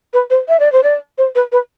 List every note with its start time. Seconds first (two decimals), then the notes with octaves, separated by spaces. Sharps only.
0.13 B4
0.30 C5
0.49 E5
0.60 D5
0.72 C5
0.83 D5
1.18 C5
1.35 B4
1.52 B4